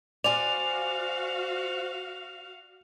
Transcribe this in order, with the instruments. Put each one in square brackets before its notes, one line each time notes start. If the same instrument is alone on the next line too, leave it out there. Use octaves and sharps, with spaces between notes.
[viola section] F#4 F5 [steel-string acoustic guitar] C5 G#5 [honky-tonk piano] D5 [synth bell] F7